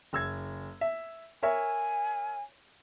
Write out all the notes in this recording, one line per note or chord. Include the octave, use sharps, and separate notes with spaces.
F#1 E6 G#6
E5
A#4 C#5 E5 G#5